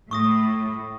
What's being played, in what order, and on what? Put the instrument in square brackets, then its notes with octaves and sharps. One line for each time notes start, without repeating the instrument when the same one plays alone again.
[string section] A2 [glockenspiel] C#6 D#6 A#6